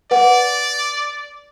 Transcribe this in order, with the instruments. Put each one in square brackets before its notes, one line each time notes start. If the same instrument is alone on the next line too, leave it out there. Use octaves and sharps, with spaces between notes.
[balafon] B4 F#5 [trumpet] D5